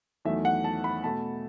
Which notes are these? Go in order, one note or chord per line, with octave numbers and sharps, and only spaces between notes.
E2 D#3 F#3 A3 E5
F#5
A5
B5
B2 A3 A5